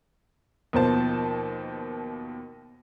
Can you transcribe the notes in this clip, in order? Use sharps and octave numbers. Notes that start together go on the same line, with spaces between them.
D#2 B2 F3 C5 A5